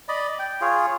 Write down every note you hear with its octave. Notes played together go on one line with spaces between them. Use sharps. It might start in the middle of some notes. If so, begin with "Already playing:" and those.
D5 D#5 B5
G5
F4 G#4 C#5